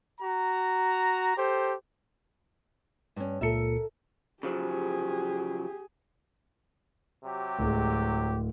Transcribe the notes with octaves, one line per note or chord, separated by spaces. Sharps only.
F#4 A#5
G4 A4 C5
G2 C#4
C#2 A#2 A4 A#4 E5 C#7
C#3 F3 F#3 G4 G#4
C3 F#3 G4
D1 G#3